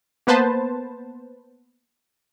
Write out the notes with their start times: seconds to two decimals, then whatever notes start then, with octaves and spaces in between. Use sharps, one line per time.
0.27 A#3 B3 B4 C5 A5